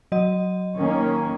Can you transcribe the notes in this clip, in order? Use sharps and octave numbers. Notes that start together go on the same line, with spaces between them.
F#3 D#5
D#3 A#3 C#4